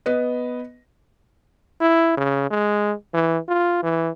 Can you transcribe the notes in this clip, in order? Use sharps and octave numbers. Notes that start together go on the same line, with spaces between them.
B3 B4 D#5
E4
C#3
G#3
E3
F4
E3